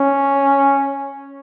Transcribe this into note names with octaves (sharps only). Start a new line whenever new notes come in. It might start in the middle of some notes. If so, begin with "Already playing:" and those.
Already playing: C#4